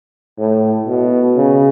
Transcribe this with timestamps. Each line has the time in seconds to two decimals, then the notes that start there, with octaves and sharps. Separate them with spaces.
0.38 A2
0.87 B2
1.37 C#3